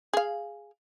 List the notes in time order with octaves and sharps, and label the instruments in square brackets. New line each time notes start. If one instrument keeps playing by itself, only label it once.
[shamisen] G#4 F5